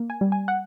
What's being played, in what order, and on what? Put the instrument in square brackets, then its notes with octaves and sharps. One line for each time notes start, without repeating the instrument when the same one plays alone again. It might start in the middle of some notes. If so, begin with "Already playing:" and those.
Already playing: [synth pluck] A#3
G#5
G3
G#5
F#5